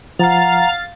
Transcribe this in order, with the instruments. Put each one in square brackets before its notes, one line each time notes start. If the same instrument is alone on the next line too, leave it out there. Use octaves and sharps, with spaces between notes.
[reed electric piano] F3 [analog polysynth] F5 A6 [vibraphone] F#5 [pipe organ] A#5